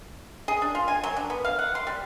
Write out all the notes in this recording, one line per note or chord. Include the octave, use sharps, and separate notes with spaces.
G#4
D4
F4
G#5
F#3
D4
B3
F5
F#5
C6
G3